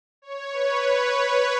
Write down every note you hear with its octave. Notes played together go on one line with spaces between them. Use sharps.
C#5
B4